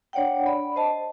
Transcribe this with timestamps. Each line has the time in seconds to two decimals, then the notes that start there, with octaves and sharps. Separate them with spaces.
0.13 D4 C#5 D5 F#5 G5
0.46 D5 B5
0.76 C5 D#5 A5